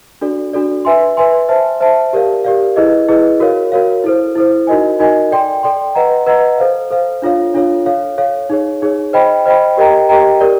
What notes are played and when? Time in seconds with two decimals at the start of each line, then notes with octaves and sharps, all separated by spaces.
0.21 D4 F#4 A4 D5
0.53 D4 F#4 A4 D5
0.85 B4 E5 G#5 C6
1.17 B4 E5 G#5 C6
1.49 C5 E5 A5
1.81 C5 E5 A5
2.13 G4 A#4 D5 F5
2.45 G4 A#4 D5 F5
2.76 E4 G#4 B4 D#5
3.09 E4 G#4 B4 D#5
3.40 F#4 A#4 C#5 F5
3.72 F#4 A#4 C#5 F5
4.04 E4 A4 C5
4.35 E4 A4 C5
4.67 D#4 F#4 A#4 D#5 G#5
4.99 D#4 F#4 A#4 D#5 G#5
5.31 A4 D5 G5 C6
5.63 A4 D5 G5 C6
5.95 B4 D#5 F#5 A#5
6.27 B4 D#5 F#5 A#5
6.58 A4 C5 F5
6.91 A4 C5 F5
7.22 D4 F4 A4 C#5 F5
7.54 D4 F4 A4 C#5 F5
7.86 A4 C#5 F5
8.18 A4 C#5 F5
8.50 D#4 G#4 C#5
8.82 D#4 G#4 C#5
9.13 C5 D#5 G5 B5
9.46 C5 D#5 G5 B5
9.77 G4 A#4 D#5 G5 A#5
10.09 G4 A#4 D#5 G5 A#5
10.41 G4 A#4 D5